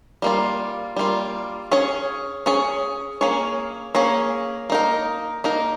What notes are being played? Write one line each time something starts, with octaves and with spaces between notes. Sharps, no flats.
G3 A#3 F4
G3 A#3 F4
C#4 G#4 C#5
C#4 G#4 C#5
A#3 C#4 G#4 C#5
A#3 C#4 G#4 C#5
A#3 D#4 A#4
A#3 D#4 A#4